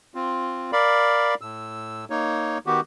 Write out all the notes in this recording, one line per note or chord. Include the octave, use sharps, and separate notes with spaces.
C4 F4
A#4 D5 F5 B5
A2 E6
A#3 D#4 C#5
D#3 B3 F#4 G4